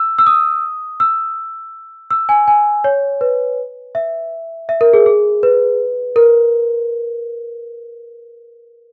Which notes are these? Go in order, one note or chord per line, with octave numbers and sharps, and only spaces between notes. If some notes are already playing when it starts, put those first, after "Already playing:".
Already playing: E6
E6
D#6
E6
E6
G#5
G#5
C#5
B4
E5
E5
A#4
G#4
G#4
B4
A#4